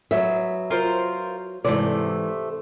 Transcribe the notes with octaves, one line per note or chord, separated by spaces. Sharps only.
F#3 B3 E5
F4 A#4 C5
G#2 C3 E3 A3 D5